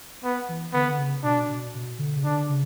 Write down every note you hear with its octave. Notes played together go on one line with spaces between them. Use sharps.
B3
E3
D3 B3
D3
C#3
B2 D4
B2
B2
D3
C#3
D3 D4
C#3